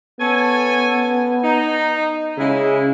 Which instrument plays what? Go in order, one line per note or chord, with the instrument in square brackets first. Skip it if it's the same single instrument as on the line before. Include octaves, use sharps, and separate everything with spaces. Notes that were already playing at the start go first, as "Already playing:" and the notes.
[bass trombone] B3 [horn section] C#4 A4 G#5
[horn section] D#4
[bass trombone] C#3 [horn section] G#3 E4